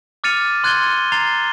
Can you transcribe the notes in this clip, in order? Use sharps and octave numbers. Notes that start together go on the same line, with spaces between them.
D6 F6 A6 C#7 D#7 F7
C6 F#6 G#6 A6 D#7 G7
A#5 A6 C7 F7 G7